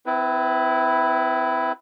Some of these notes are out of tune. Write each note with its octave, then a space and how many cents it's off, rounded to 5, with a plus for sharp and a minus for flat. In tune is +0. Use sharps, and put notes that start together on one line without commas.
C4 -35 E4 +0 B4 +0